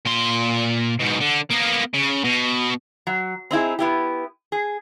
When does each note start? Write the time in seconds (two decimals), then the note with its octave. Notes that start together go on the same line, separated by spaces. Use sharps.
0.06 A#2 C6
1.00 G#2 B2
1.21 D3
1.51 A#3 B3
1.94 C#3
2.24 B2
3.07 F#3
3.51 C4 D#4 E4 G#4
3.79 B3 E4 G4
4.52 G#4